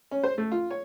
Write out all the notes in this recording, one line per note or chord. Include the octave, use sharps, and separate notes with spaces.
C#4
C5
A3
F4
C#5